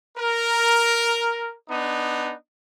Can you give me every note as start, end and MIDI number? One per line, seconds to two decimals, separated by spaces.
0.17 1.53 70
1.68 2.33 59
1.68 2.33 62
1.68 2.33 63